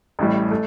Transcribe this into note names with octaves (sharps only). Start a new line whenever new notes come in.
A1 A2 G3
A3